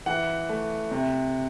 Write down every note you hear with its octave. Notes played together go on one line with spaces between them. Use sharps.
E3 F#5
A3
C3